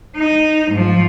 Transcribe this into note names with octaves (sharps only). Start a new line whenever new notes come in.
D#4
G#2 F3